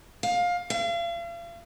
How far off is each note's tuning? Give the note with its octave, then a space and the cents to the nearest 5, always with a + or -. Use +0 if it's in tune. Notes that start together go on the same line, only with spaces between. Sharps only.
F5 +20
F5 -40